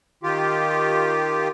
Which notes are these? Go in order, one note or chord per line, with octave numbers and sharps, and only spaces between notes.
D#3 F4 G4